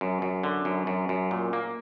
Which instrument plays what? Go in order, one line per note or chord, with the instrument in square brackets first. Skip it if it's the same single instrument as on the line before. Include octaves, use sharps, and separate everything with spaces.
[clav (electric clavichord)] F#2
F#2
D3
F#2
F#2
F#2
A#2
A#3